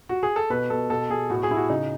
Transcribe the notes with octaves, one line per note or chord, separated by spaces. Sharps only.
F#4
G#4
A4
B2 B4
B2 A4
B2 A4
B2 G#4
A2 F#4
G#4
A2 E4
F#4
C#3 D#4